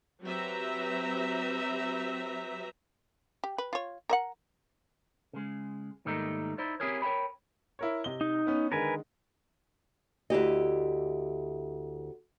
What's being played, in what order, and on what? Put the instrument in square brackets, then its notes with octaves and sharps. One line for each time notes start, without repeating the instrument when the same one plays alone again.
[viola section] F#3 C4 G4 B4 E5 A#5
[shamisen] G4
B4
F4 C#5
A#4 E5 F#5
[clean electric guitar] C#3 G#3
G#2 D#3 G3 A3 A#3 D#4
D#4 E4 C5 D5
C4 E4 G4 G#4 A#4 C#5
A#4 C#5 F5 G5 B5
[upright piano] E4 A#4 C#5
C3 D#5 G7
[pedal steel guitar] D#4
[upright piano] B3 C#4
[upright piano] D3 D#3 G#3 [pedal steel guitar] A#4 B4 G#5
[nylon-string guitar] D2 E4 G4 D#5